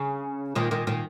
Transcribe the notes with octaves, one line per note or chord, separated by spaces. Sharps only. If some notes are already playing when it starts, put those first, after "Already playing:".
Already playing: C#3
A#2 D#3
A#2 D#3
A#2 D#3